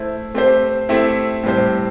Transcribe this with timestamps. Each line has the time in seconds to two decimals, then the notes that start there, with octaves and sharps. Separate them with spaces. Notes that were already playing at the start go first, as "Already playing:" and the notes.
Already playing: A3 E4 C5
0.34 A3 C4 G4 C5
0.89 A3 C4 E4 G4
1.43 A2 G3 C4 G4 C5